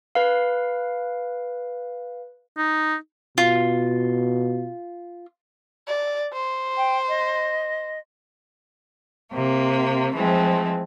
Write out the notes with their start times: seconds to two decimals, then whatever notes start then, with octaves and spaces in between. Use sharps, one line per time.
0.15 B4 F5
2.57 D#4
3.38 B2 F4
5.88 D5
6.32 C5
6.77 G5
7.08 D#5
9.32 C3 A#3
10.14 E3 F3 G#3 A3 C4